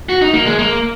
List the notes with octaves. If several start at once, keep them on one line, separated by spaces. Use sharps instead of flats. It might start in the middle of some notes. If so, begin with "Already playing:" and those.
F#4
D#4
A#3
G#3
A#3